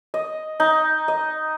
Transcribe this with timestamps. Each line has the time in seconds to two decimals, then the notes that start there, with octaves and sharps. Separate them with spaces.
0.14 D#5
0.60 D#4
1.08 D#5